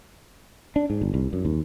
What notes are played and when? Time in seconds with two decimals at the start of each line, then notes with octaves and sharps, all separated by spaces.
0.76 D4
0.90 G#2
1.01 G1
1.14 C2
1.33 F#2
1.45 D#2